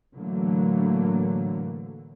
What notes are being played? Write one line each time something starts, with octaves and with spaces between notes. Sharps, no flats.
A2 D3 E3 F#3 A3 A#3